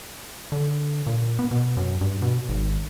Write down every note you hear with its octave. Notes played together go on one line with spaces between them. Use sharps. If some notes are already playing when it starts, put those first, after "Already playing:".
D3
A#2
B3
B2
F#2
G2
B2
G#1